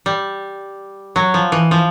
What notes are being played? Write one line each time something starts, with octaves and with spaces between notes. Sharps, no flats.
G3
F#3
F3
E3
F3